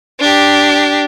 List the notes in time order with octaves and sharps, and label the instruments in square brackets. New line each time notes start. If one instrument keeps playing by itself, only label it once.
[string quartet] D4 G4